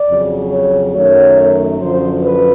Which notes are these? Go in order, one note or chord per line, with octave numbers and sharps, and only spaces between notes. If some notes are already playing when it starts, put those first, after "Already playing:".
Already playing: D5
F2 C#3 F#3
C#5
F#2 D#3 F#3 A3 C#5
F#2 D3 F3 C5
B4